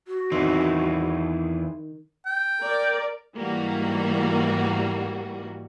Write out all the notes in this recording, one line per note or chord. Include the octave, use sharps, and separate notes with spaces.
F#4
E2 D#3 C4
G5
A#4 D5
G#2 E3 G3 A#3 F#4